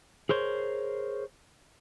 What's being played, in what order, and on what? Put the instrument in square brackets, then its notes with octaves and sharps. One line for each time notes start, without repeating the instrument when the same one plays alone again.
[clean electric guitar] G#4 A#4 C5 C#5